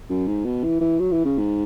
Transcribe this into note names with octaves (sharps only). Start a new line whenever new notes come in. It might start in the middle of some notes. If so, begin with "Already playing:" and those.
F#2
G#2
B2
E3
E3
F#3
E3
C#3
G#2